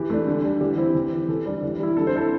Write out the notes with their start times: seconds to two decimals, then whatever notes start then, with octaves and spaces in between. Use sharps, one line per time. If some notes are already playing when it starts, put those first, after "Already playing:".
Already playing: E3 G4
0.10 A3 D4
0.27 D3
0.44 G3 D4
0.61 E3 G4
0.78 C4 E4
0.95 E3
1.12 C4 E4
1.29 E3 A4
1.46 G3 D4
1.63 E3
1.80 G3 E4
1.97 D3 A4
2.07 C5
2.14 C4 E4 A4